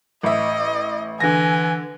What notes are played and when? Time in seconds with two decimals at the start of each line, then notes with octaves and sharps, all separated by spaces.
0.23 A1 D#5 E5
1.20 D3 E3 G#5 A#6